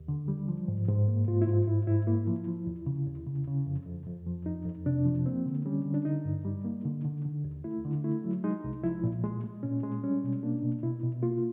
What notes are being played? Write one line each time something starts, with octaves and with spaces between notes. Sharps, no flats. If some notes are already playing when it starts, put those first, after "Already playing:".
Already playing: D#2
D3
G3
F3
G#2
G#2
A#3
G#2 F4
E4
G#2 F4
G#2 E4
G#2 E4
A#3 E4
F3
F3
D#2
C#3
D#2
C#3
C#3
F2
F2
F2
F3
F2 D#4
F2
C3 D4
F3
A#3 C4
D3
G3 C#4
D3
D4
D3 D#4
G2
G3
A#3
D3
D3
D3
D#2
A3 E4
D3
A3 E4
F#3
G#3 D#4
C2
F3 E4
A#2
G#3
G#3
A#2 C#4
G#3
G3 C#4
B2
A#3 D4
B2
B2 E4
B2
A#3 F4